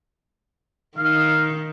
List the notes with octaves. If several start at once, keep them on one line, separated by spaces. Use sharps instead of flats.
D#3 D#4 F5